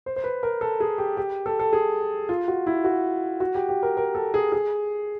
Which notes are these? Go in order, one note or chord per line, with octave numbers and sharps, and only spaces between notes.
C5
C5
B4
A#4
A4
G#4
G4
G4
A4
A4
G#4
F4
F#4
E4
F#4
F#4
G4
G4
A#4
A#4
A4
G#4
G#4